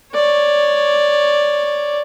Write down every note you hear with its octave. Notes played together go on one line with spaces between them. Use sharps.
C#5 D5